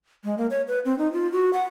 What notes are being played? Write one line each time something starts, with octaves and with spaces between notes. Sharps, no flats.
G#3
A#3
C#5
B4
C4
D#4
F4
F#4
F#5